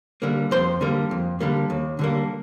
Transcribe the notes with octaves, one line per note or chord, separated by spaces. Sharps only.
D3 G3 A#3
F2 C5
D3 G3 A#3
F2
D3 G3 A#3
D#2
D3 G3 A#3